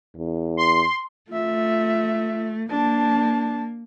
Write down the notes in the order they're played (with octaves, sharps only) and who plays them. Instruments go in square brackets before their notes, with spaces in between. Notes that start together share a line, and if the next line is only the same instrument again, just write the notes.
[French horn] E2
[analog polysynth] C6
[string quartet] A3 [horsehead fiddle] F4 E5
[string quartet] A#3 [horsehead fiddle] D4 A5